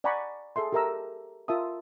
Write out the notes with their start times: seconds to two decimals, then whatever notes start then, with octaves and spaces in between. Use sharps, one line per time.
0.04 D5 F#5 G#5 A#5 B5 C#6
0.56 G#4 A4 E5 C6
0.72 G4 A4 A#4 E5 A#5 E6
1.48 F4 A#4 E5 A5 D#6